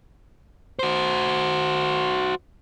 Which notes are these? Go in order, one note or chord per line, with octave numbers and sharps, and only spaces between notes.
F#4 C5